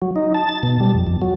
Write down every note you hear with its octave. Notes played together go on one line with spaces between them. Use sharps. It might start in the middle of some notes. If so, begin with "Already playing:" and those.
F#3
D#4
A5
A6
B2
G3
F2
F2
F#3